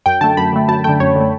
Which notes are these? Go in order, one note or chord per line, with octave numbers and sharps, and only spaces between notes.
F#2 G5
D3 A3 A5
F#2 B5
D3 A3
F#2 A5
D3 A3 G5
F#2 C#5
D3 A3